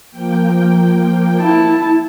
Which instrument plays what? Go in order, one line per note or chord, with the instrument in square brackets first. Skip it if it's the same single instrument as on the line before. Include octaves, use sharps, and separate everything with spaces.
[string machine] F3 A#3 G5
[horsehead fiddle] E4 A5